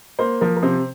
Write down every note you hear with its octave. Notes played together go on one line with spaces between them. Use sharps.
A#3 C5
F3 A#4
A#4
C3 C5